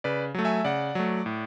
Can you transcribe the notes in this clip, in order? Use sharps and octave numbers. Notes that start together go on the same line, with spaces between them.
C#3 B4 D5
F#3 A3
E5 G#5
C#3 D5 F#5
F#3 A3
A2